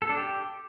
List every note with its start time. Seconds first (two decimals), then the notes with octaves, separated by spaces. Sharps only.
0.02 A4
0.09 D4
0.17 G4